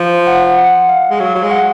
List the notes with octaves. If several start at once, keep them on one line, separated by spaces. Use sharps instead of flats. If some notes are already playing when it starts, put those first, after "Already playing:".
Already playing: F3
F#5
F#5
F5
G#3
F#3 F5
F#3
G#3 F5
F#5